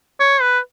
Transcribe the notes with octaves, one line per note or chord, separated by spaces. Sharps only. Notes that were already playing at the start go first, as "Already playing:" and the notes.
C#5
B4